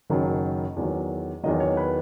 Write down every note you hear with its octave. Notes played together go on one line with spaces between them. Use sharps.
F#1 F#2 D#3 F#3
E2 D#3 F#3
E2 D#3 F#3 D#5
C#5
B4